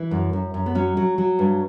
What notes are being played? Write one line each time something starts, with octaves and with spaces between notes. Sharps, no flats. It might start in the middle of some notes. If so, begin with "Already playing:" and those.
Already playing: E3
F#2
F#2
F#2
B3
F#3 C#4
F#3
F#3
G2